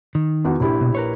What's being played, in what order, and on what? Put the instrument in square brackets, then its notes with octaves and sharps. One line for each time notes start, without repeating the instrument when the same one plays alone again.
[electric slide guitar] D#3
[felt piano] E2 F#4
A#1 E4 G4
[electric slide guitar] B2
A#4 B4 C#5